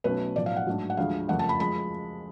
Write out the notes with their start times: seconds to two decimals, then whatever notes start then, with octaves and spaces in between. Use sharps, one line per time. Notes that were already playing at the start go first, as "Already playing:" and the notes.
0.04 B1 B2 A3 C#4 B4
0.36 B1 A2 F3 D5
0.46 F5
0.56 F#5
0.67 G#2 F#3 A3 D4
0.90 F#5
0.97 D2 D3 F3 G#3 F5
1.28 F#1 F2 F3 A3 F#5
1.39 A5
1.49 B5
1.59 F3 G#3 B5